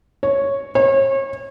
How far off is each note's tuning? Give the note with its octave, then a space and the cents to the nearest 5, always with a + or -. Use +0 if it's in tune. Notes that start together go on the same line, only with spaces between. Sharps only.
C#5 -5
C#5 -35